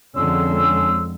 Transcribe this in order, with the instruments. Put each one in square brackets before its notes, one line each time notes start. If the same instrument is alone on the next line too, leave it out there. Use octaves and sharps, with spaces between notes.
[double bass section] F2 D3 G#3 [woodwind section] C#4 C6 E6